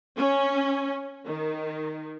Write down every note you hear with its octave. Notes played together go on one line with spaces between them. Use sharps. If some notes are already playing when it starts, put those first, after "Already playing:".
C#4
D#3